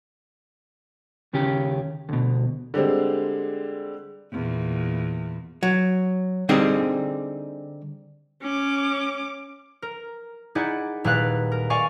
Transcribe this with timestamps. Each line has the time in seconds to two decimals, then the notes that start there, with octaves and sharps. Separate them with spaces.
1.33 D#2 C#3 C#4 G4
2.09 D2 B2
2.74 D3 G3 G#3 C4
4.32 E2 A#2
5.63 F#3
6.49 D3 G3 C4 D#4 G#4
8.42 C#4 D6
9.82 A#4
10.55 D#4 E4 G#4 D5 F#5
11.04 D#1 E4 B4 D5 F5 F#6
11.52 A#4
11.70 D5 F5 G#5 C#6